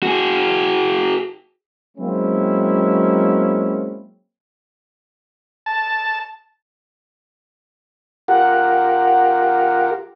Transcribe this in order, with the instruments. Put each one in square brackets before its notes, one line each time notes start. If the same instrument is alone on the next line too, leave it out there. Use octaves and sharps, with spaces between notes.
[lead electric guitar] F#4 G#4
[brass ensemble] F#3 G#3 A#3 C4 C#4 E4
[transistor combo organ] A5
[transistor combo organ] F4 G4 A#4 [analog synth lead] F#5